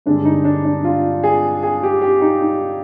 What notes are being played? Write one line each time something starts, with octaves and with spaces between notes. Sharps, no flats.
G2 D3 G#3 D4
D#4
D4
D4
F4
G#4
G#4
G4
G4
D#4
D#4